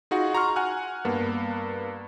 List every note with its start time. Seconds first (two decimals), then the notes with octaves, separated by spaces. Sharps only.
0.11 D#4 F4 F#4 G#4 F#5
0.34 A#5 C6 C#6 F6
0.56 F#5 G#5 F6 F#6
1.05 G2 A#3 B3